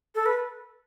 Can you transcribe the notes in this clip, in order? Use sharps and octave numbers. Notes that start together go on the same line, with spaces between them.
A4
B4